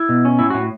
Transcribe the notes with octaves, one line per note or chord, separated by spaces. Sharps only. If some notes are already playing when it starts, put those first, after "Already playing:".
Already playing: E4
B2
C#4
A2 E4
A2 F#4